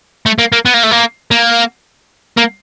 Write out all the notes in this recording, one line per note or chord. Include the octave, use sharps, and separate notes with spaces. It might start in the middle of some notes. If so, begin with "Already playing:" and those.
A3
A#3
A#3
B3
A#3
A3
A#3
A#3
A#3